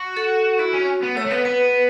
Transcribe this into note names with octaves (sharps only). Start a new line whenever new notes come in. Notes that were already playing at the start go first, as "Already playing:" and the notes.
Already playing: F#4
A4
E4 F#4
C#4
B3
A3 C#5
A3
B3 B4
B3 B4